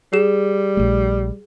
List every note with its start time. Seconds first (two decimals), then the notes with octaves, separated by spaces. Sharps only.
0.13 G3 G#4 E7
0.77 A#1 A3